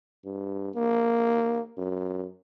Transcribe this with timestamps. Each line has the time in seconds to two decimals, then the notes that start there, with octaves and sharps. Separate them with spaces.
0.25 G2
0.75 A#3
1.78 F#2